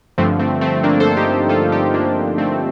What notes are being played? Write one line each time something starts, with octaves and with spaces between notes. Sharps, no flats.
G2 D3 F3 A3 C4
A3 C4
A3 C4
A#3 D4
A4 C5
D#4 G4
F4 A4
D#4 G4
A#3 D4
A3 C4